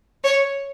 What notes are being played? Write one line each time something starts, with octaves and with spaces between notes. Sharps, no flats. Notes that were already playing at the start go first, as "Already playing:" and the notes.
C#5